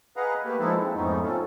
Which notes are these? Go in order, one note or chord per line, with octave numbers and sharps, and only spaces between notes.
G#4 B4 D#5 F5 F#5 A#5
A3 A#3 G4 B4
F3 G#3 D#4 E4 A4
G#3 C4
F2 G#2 C#3 A3 B3 D#4
C4 C#4 F4 A4